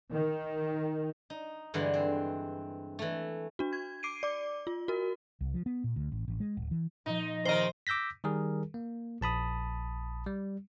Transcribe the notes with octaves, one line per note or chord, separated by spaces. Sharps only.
D#3
D#4
G2 D3 E3 G#3
C4
E3 A3
D4 F#4
G#6
D6 C7 D7 D#7
D5 D6
F4
F#4 A#4
C2
F3
B3
A#2
D2
A1
A1
G#3
D1
E3
A#2 F3 D#4
C3 D#3 A#4 C5 D#5 C6
D6 E6 G6 A#6 B6
D#3 G3 G#4 A#4
A#3
A#1 A5 B5 D#6
G3